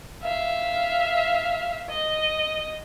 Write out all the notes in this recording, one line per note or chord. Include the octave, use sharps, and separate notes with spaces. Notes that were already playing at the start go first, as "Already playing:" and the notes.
E5 F5
D#5